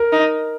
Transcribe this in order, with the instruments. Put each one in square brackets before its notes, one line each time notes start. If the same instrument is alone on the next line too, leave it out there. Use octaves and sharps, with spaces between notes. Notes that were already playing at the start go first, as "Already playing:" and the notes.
Already playing: [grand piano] A#4
[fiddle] D#4